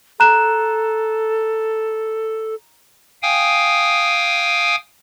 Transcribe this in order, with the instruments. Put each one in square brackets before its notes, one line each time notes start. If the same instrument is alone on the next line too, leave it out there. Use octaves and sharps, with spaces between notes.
[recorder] A4 [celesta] A#5 F#6 E7
[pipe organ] F5 G5 G#5 D#6